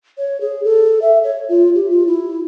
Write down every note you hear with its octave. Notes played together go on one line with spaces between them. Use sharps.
C#5
G#4
A4
E5
C#5
F4
G4
F4
E4